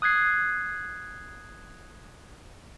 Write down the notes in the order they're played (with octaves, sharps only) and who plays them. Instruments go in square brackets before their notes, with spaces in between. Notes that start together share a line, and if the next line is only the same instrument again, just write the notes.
[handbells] D#6 F#6 G#6 C7